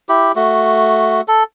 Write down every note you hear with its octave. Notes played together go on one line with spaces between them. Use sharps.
E4 G4
A3 F#4
A4